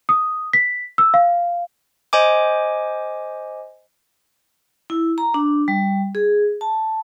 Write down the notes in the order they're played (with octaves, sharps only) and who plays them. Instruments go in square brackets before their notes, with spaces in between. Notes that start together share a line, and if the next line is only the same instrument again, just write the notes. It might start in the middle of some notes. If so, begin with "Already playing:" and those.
[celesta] D#6
B6
E6
F5
[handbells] C5 D#5 G#5 D6
[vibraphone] E4
A#5
D4
G3
G#4
A5